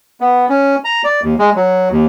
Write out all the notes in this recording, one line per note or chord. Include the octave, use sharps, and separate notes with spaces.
B3
C#4
A#5
D5
D#2
G#3
F#3
D#2